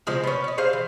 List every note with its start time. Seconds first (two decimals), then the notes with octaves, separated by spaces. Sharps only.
0.07 C#3 F3 G#3 C4
0.24 B3 C#4
0.44 C#4 D#5
0.58 G#4 C5 F5
0.73 E3